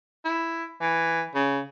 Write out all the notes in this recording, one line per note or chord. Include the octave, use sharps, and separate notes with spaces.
E4
E3
C#3